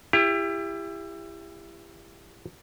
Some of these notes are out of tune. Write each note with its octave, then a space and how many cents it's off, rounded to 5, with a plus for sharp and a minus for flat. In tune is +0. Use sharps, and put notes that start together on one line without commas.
E4 +25 G4 +30